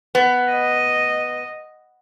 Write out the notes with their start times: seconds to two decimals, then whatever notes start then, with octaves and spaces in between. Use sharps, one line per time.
0.15 B3
0.51 D#5